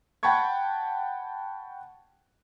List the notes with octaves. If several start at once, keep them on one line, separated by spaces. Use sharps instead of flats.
F#5 G5 A5 B5 C#6 G#6